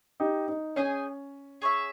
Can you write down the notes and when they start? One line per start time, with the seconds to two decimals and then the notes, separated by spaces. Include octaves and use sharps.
0.20 D#4 G4
0.48 D#4
0.76 C#4 D#4 G#4 D#5 G#5
1.62 G#4 C#5 E5